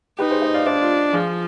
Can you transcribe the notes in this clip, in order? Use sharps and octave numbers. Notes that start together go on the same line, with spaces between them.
D#4 G4 B4
G#4 C5
C5 D#5
D5 F5
D4 C5 D#5
F4
F3 F4 G#4